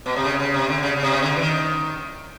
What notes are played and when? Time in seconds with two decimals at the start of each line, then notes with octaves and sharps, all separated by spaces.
0.06 B2
0.16 C3
0.25 C#3
0.40 C#3
0.54 C3
0.69 D3
0.83 C#3
0.96 C#3
1.03 C3
1.12 C#3
1.22 D3
1.36 E3
1.41 D#3